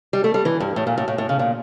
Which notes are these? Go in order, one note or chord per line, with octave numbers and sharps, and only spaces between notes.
G3
A3
G3
E3
G2
A2
A#2
A2
A2
A2
C#3
A#2